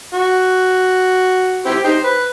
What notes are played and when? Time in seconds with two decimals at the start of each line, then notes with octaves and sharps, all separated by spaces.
0.13 F#4
1.66 C4 E4 G4
1.84 D#4 G4 C5
2.04 B4